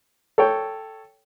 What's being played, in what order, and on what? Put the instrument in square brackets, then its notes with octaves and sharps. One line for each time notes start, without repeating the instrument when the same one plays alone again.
[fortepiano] A4 C#5 G5